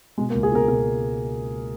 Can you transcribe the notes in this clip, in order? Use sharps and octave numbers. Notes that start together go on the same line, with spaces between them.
B2 G#3
A#3
C#2
G#4
B2 A#4
B2 A#4